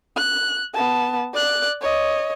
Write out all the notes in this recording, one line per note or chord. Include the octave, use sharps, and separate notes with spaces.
F#6
B3 A5
D5 F#6
C#5 D#5